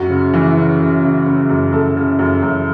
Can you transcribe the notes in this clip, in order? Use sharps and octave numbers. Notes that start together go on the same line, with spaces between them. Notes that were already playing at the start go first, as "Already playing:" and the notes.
Already playing: F#2 F#4
C#3
E3
C#3
C#3
C#3
C#3
F#2
F#2 A4
C#3
F#2
F#2